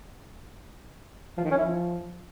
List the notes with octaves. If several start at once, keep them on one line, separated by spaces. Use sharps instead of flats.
F3
D#3
C#4
E4
F3